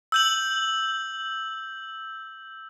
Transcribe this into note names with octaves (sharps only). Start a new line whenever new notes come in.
E6 G6 F#7